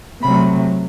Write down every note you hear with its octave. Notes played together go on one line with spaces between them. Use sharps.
C3 F#3 A3 B5